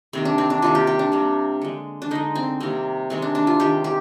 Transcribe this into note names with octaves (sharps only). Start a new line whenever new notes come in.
C3 D#3 A#3 C4
D4
C4
D4
C3 D#3 A#3 F4
G4
G4
D4
C3 G3 A#3
D3 G#3
D4
D3 G#3 D#4
C4
C3 D#3 G3 A#3 C4
C3 D#3 G#3 C4
D4
D4
F4
D#3 G#3 G4
G4